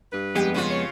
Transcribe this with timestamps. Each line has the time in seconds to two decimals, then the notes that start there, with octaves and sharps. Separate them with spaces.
0.13 G2 B4
0.35 F2 G#3 B3 G4
0.54 C#3 F4
0.70 C#5